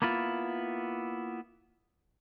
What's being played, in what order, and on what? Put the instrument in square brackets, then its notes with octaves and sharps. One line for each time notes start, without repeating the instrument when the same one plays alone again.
[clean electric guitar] A#3 B3 E4 F4